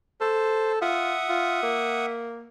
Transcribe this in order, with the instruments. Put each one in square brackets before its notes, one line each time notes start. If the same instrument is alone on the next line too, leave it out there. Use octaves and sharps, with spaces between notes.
[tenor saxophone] A4 [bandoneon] C5
[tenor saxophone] F4 [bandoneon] E5 F#5 D#6
[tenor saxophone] F4
A#3